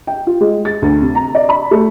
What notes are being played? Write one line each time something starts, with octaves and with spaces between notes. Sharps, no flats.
G5
F4
G#3
A6
D2
C3
A#5
D5
B5
A3